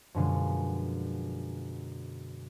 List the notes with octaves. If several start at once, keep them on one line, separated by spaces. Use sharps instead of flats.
F#2 B2 D3 F3 G#3